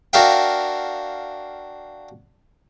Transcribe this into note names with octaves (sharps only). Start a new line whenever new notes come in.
D4 F#4 A#4 E5 F5 G5